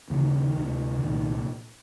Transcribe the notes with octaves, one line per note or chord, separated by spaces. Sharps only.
D#2 C#3 E3
D#3
D3
D#3
D2 C3
D3
C2 A#2 D#3